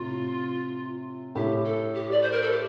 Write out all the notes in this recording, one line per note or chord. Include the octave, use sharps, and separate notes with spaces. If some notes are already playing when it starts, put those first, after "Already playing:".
Already playing: A2 C3 F4
A2 G4
A4
G4
D5
C5
A#4
A4
G4